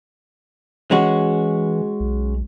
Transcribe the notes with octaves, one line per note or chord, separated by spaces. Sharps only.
E3 G#3 C#4 F#4
B1